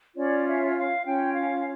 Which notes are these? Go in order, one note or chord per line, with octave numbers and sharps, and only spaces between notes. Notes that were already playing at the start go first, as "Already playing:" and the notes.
C#4 F4 C#5 D5
E5
F5
C#4 F4 C#5 G5
F5